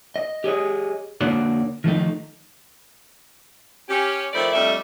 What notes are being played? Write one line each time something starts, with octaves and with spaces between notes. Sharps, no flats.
D#5
G4 G#4 C#5 D#5
D3 A#3 D4 F#4 C#5 D5
D#3 F3 A3 D#4
C#4 G4
D#3 F3 A3 E4 C5 D5
F2 G3 A3 D4 D#5 E5